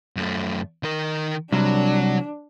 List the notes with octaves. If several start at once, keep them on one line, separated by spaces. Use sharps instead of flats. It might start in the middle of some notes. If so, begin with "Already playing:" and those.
F#2 A3
D#3 A#4
C2 F#3 D4